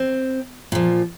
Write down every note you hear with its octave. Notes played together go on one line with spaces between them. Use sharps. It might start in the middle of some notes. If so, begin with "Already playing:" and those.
Already playing: C4
A#2 F3